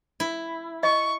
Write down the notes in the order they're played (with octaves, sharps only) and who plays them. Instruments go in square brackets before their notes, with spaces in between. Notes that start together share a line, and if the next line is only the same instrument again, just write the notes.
[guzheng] E4
[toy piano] D#5 [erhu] C#6